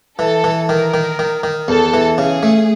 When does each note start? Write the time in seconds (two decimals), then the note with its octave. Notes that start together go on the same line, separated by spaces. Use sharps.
0.19 E3 A4
0.44 E3
0.69 D#3 A#4
0.94 D#3
1.19 D#3
1.43 D#3
1.68 E2 A4
1.93 E3
2.18 C#3 G#4
2.43 A3